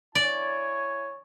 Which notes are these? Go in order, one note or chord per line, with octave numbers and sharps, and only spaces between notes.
E4 C#5 D5 G#5